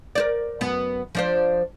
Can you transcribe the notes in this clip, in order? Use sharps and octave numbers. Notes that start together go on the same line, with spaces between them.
A#4 C5 D5
F#2 B3
F3 D4 C5